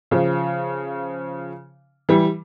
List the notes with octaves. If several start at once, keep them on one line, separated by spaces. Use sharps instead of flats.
C#3 F3
E3 G3